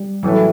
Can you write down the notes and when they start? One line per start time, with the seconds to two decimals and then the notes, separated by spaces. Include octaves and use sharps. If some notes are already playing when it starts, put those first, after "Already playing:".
Already playing: G3
0.23 A2 E3 F#3 A3 C#4